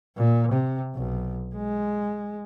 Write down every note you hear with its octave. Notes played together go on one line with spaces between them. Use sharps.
A#2
C3
B1
G#3